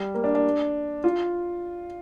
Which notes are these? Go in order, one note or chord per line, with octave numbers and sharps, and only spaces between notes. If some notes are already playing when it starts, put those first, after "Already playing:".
Already playing: G3
A#3
D4
D4
F4